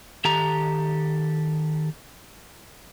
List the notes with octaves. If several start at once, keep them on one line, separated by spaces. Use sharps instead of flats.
D#3 G4 A4 A#5